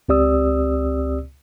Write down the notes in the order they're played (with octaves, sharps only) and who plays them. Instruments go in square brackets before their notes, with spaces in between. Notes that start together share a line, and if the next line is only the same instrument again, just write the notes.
[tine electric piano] C#2 C4 G4 D5 D#6 E6